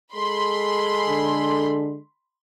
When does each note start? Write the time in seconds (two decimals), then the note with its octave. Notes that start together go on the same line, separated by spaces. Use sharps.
0.14 G#3 G#4 A4 B5 C6
1.09 D3